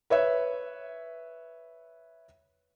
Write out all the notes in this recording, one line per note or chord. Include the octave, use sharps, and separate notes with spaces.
B4 C#5 E5